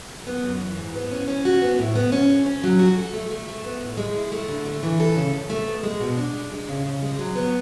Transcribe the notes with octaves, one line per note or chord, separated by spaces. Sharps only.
F#2
B3
F#2
E3
G#2
B3
C#4
C#4
F#4
B3
A2
B3
C#4
D2
C#4
F#3
F#4
A4
A3
A3
A3
B3
A2
G#3
E4
A3
D3
A3
E3
A4
C#3
C#3
A3
B2
G#3
B2
D4
G#3
G#3
C#3
C#3
G#3
F#3
B3